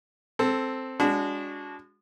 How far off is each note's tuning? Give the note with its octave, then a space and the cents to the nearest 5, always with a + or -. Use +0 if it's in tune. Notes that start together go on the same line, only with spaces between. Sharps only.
C4 +0 A4 +0
G#3 -35 D4 -25 F#4 -20